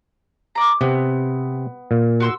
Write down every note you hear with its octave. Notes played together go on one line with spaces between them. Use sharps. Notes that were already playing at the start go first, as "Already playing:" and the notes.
D5 A#5
C3 B3 C4
A#2
F#4 C6 E6